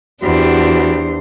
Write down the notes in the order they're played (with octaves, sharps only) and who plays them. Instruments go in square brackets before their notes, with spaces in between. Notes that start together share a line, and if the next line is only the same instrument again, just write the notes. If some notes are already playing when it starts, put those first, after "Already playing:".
[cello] E2 C5 [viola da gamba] D4 G4 [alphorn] F#4